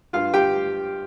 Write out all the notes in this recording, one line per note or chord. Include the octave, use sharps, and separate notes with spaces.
G2 F4 F5
G4 G5